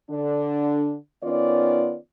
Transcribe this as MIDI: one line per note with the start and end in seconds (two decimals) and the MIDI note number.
0.11 0.96 50
0.11 0.96 62
1.24 1.97 51
1.24 1.97 59
1.24 1.97 61
1.24 1.97 65
1.24 1.97 74